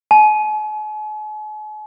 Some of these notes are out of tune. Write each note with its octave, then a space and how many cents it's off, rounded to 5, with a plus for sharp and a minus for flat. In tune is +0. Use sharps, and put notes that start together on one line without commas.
G#5 +45